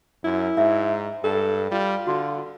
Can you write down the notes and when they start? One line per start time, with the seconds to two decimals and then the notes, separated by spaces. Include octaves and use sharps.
0.24 F#2 E4
0.57 G#2 E5
1.24 G2 A4
1.72 G3 F4
2.07 D3 F#4